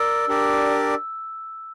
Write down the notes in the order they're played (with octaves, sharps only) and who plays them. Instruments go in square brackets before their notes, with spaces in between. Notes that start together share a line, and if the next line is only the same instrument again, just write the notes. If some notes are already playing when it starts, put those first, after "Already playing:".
Already playing: [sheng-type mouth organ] A#4 D5 [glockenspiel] E6
[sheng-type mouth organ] D4 G4 A#4 D5